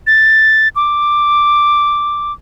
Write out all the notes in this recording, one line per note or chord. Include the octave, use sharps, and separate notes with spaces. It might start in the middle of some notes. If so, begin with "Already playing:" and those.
A6
D6